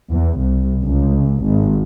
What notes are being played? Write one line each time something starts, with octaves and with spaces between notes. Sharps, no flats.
E2
C2
C#2
G#1